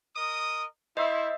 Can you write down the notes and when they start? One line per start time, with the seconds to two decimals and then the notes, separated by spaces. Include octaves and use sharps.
0.16 A#4 D#5 D#6
0.97 E4 C5 D#5 E5